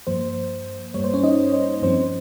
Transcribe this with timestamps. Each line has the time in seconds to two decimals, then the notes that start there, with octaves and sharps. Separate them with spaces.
0.07 G2 F3 A#3 C5
0.94 G2 G3 A#3 C#5
1.04 C5
1.14 C#4 C#5
1.24 D#4 D#5
1.54 C5
1.82 G2 F3 C4 C5